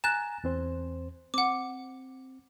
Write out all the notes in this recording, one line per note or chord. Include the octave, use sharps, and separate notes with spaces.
G#5 A#5 F#6 A6 E7
E2 C4 C5
C4 F#5 D6